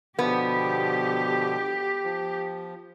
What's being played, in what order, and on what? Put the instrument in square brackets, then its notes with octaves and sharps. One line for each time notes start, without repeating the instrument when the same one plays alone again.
[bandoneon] B2 D3 F3 [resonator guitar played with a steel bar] B3 [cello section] G4
[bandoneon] F3